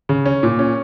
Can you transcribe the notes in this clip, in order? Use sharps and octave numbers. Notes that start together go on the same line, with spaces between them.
C#3
C#4
A#2
C#4